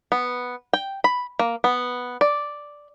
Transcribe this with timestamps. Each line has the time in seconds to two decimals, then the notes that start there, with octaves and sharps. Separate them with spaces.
0.12 B3
0.73 G5
1.04 B5
1.39 A#3
1.64 B3
2.21 D5